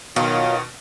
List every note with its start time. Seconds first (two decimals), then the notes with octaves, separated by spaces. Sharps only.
0.16 B2 D#3 F#3 F4